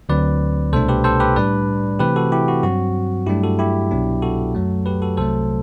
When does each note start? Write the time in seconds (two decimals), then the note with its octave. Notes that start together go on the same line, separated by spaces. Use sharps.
0.09 D2 D3 F#3 C4 B4 D5
0.73 C2 B2 A3 D4 A4 C5
0.88 G4 B4
1.04 A4 C5
1.20 G4 B4
1.36 A2 G3 D4 B4 D5
1.99 C3 E3 A3 C4 G4 B4
2.16 F#4 A4
2.32 E4 G4
2.48 F#4
2.63 G2 F#3 C4 F#4
3.27 G2 F#3 A3 D4 E4 G4
3.43 F#4 A4
3.59 E4 G4
3.91 C2 B2 F#3 B3 D4
4.22 F#4 A4
4.55 F#2 F#3 A3
4.86 G4 B4
5.02 F#4 A4
5.17 C2 C3 F#3 A3 A4 C5